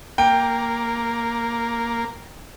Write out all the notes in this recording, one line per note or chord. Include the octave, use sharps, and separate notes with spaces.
A#3 G5